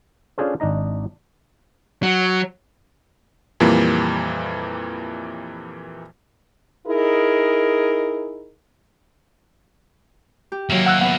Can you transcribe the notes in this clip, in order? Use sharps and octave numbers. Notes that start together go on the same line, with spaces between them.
C#4 D4 F4 G#4 A4 C5
G#1 D4 D#4 D#5 A#5
F#3
F2 A#2 E3 G3 A#3
D#4 E4 G#4 A#4
G4
D#3 F#3 A#3 E4
F#5 E6 F#6
B3 B4 F5 F#5